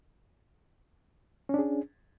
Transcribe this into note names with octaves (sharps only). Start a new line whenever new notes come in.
C#4 D4 G#4